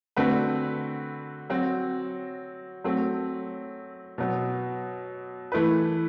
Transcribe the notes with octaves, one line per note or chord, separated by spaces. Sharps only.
D3 A3 C4 F#4 B4
F#3 C4 F#4
F#3 A3 C4
B2 F#3 B3
E3 A3 E4 B4